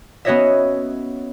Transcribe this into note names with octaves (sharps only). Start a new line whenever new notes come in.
B3 C#4 F#4 C#5 D#5 E5